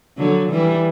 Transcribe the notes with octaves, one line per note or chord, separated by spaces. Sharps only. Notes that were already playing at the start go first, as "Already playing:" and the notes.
D3 F#3
E3 G3